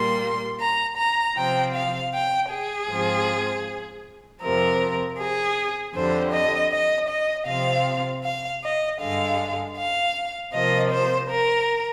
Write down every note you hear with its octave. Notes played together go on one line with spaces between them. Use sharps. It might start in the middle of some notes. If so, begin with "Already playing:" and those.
Already playing: A#2 G3 A#3 C6
A#5
A#5
C3 F3 C4 G5
F5
G5
G#4
G#2 F3 C4
F2 C3 F3 A#4
G#4
F2 D3 G3 C5
D#5
D#5
D#5
C3 F3 C4 F5
F5
D#5
G2 D3 G#3 F5
F5
C3 F3 A#3 D#5
C5
A#4